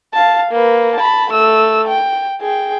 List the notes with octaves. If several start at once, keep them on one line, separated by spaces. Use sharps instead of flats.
F5 A5
A#3 B4
A5 B5
A3 E6
G5
G#4 G5